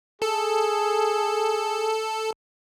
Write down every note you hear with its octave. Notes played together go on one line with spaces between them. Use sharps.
G#4 A4